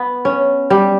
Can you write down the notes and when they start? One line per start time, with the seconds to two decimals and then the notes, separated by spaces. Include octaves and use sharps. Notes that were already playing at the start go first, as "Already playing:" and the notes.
Already playing: B3
0.25 C#4
0.70 G3